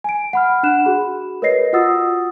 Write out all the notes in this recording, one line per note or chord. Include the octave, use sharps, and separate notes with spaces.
G#5 D7
F#5 B5 F6
D4 F#5 F#6 E7
F#4 G#4 B5
A#4 B4 C#5 D#5 A#6 C7
F4 F#4 F#5 D#6 E6 A6